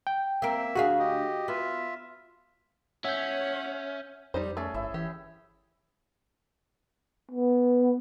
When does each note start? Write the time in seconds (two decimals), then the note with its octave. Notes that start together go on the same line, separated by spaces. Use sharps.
0.07 G5
0.42 A#3 C4 A#4 E5
0.75 D2 F#4 G#4 F5
0.99 G4 D#5
1.48 B3 F4 E5
3.04 C#4 C#5 E5 F#5 G6
4.34 F2 G3 D#4 C5
4.57 A3 C#4 G#4
4.74 G1 E4 E5
4.94 E3 G4
7.31 B3